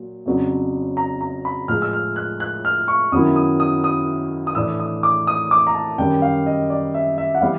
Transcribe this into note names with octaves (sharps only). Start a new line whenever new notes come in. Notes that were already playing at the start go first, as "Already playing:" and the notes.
Already playing: A#2 F#3
F2 C#3 F#3 B3 D4
A#5
A#5
B5
A2 F3 G#3 F6
E6
F6
F#6
F#6
F6
C#6
F#2 D#3 F#3 B3 E4 D#6
D#6
D#6
D#6
D#6
A2 E3 A3 D4 E6
D#6
D6
D#6
D6
A#5
A5
F#2 D#3 G3 G5
F5
D#5
D5
E5
E5
F#5
E3 G3 B3 F5